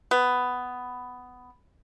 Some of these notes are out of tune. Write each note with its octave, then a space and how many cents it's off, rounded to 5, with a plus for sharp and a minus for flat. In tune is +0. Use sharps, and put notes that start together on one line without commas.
B3 +10